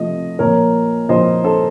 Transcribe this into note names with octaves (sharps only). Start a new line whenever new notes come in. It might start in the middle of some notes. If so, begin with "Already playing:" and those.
Already playing: C3 F3 A3 D#5
A#2 F3 A#3 A#4 C#5
A#2 F3 A#3 C5 D#5
A4 C5